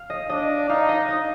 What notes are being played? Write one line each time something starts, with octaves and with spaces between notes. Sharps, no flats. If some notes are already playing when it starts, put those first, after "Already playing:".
Already playing: F5
D#5
D4 D#5
D#4 F5
D#5
D#5